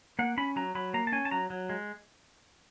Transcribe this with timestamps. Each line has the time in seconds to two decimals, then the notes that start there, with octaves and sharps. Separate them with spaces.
0.19 A#3 F#5
0.37 C#4 B5
0.56 F#3 A#5
0.75 F#3 B5
0.94 A#3 A#5
1.07 A5
1.12 C#4 G#5
1.25 A5
1.31 F#3 A#5
1.50 F#3
1.69 G#3